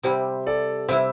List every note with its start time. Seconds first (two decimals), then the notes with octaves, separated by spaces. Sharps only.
0.03 C3 G3 E4 G4 C5
0.46 A4 D5
0.88 C3 G3 E4 C5 E5